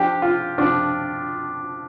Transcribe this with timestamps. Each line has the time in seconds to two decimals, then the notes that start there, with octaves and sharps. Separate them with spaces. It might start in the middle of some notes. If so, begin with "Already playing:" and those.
Already playing: F3 D4 G4
0.22 F4
0.58 F3 D4